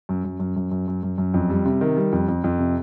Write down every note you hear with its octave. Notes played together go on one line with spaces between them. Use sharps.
F#2
F#2
F#2
F#2
F#2
F#2
F#2
F#2
F2
G3
C3
D#3
G3
F2
F2
F2
C3